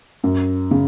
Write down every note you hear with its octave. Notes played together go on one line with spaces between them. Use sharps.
F#2
C#3